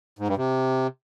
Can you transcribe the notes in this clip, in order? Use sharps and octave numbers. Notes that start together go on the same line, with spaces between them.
G#2
G2
C3